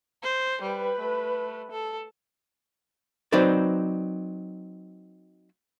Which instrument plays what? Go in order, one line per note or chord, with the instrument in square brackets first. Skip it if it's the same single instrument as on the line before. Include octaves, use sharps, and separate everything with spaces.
[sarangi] C5
[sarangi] G3 [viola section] B4
[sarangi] A3
A4
[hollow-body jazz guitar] F#3 C4 D#4 B4 C5 D5